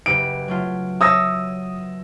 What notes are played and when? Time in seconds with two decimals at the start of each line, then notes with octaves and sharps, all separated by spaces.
0.06 F#1 G4 B4 D7
0.48 F#3 A3 F4
1.01 C#5 E5 A5 D#6 E6 A#6